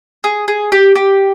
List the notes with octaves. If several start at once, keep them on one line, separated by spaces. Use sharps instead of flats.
G#4
G#4
G4
G4